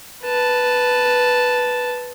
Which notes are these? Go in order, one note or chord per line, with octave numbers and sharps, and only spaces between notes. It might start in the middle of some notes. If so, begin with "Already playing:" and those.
B4 A5